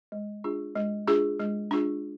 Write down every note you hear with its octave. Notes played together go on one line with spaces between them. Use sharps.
G#3
D4 F4 G#4
G#3
D4 F4 G#4
G#3
D4 F4 G#4